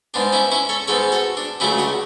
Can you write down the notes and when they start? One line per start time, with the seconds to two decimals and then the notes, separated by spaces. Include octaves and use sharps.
0.14 G#2 G#3 B3 D4
0.33 C#4 E4
0.51 C#4 E4
0.69 A4 C#5
0.88 G#2 G#3 B3 A4 C#5
1.12 F#4 A4
1.37 D4
1.60 C#2 C#3 F#3 A3 C#4 E4
1.78 D4 F#4